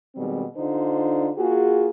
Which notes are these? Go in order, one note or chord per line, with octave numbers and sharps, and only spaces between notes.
B2 D#3 G3 G#3 C4
D3 D4 D#4 F4 C5
A#3 F4 F#4 G#4